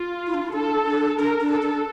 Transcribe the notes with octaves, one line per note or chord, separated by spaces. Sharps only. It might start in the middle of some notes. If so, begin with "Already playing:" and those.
Already playing: F4
E4
D4
E4
D4 A4
D4
D4 A#4
D4
A4
D4